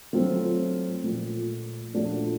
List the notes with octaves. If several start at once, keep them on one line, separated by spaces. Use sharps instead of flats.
F#3 A3 C4 F4
A#2 F3 A3
A#2 F3 A3 D4 F#4